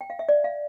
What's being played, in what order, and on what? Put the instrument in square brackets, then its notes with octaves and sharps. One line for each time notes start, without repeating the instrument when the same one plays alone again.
[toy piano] G5
F5
E5
D5
F5